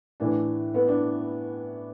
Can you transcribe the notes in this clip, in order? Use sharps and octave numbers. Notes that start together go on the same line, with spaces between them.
A2 E3 D4
B3
D4